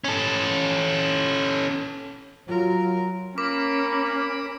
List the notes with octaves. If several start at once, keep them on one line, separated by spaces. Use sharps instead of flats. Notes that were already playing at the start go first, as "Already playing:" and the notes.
C#4 A4
F#3 F4 A#4
A#3 C#4 A#4 B5 D6